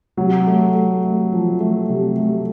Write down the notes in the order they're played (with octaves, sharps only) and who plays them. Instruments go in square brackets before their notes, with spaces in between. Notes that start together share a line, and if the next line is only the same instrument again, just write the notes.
[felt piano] C3 [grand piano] F#3
[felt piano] A3
A3
A3
F3
A3
C3
A3